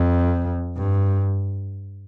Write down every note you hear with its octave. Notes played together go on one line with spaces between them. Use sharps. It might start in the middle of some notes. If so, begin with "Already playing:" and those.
Already playing: F2
G2